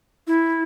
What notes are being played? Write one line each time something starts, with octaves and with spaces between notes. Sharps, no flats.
E4